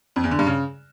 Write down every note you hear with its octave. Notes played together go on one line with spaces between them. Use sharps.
F2
E2
D3
G2
C#3